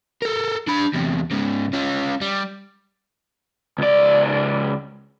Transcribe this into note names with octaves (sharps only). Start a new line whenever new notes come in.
A4 A#4
D4 B5
E2 C3
G#2 C#3
C#4 F4
G3
C#2 D5